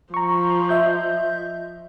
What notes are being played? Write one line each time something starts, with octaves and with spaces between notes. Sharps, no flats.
F3 A#5 C#6
D#5 E5 G6